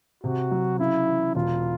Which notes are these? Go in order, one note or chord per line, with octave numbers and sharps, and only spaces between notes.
C3 F#4
F#3
C#3 E4
E3
E1 F4